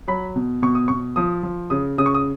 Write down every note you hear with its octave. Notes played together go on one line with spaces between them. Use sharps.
F#3 B5
B2
B2 C#6
D#6
B2 C#6
F3 D#6
F3
C#3 D#6
C#3 D#6
C#6
D#6